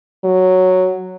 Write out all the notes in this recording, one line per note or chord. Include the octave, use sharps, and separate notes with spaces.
F#3